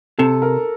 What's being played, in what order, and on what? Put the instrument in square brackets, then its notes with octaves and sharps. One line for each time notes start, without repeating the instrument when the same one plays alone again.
[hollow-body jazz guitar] C3 [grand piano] A4
[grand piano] A#4